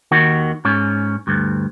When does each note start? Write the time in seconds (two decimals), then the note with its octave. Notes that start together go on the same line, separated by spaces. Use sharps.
0.11 D#2 D#3 F#4
0.65 G#2 C#4
1.27 D2 G2